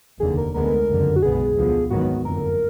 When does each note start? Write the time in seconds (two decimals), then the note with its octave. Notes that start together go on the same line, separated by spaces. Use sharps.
0.20 F1 D#2 D3 G#4
0.38 A#4
0.54 D2 D3 G#3 B3 A#4
0.88 F#1 F2 D3
1.16 F#4
1.22 B1 B2 G#3 B3 G#4
1.56 D2 D3 F3 B3
1.90 G#1 G#2 D#3 F#3 B3 F#4
2.25 F#1 F2 D3 A#4